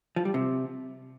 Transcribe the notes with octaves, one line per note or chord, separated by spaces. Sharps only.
F3
G3
C3